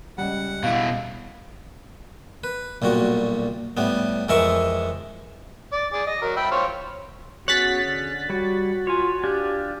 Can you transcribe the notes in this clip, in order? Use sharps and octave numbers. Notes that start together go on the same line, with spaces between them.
C#2 C#3 G3 F#5
B2 E4 F5
B4
B1 A#2 G3 F#4
A2 G3 B3
F2 E3 G#3 A#4 E5 C#6
D5
G#4 D5
D#5
F#3 A#4
E5 G5 B5
C5 C#5 F5
B3 C#4 F#4 G#4 C#5 F#6 A6 B6
D3
G3 F#4 C#5
F4 C#5 G#5
D4 F4 G4 G#5